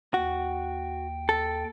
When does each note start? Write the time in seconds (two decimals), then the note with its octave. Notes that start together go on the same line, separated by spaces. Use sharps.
0.14 D#2 F#4 G5
1.29 A4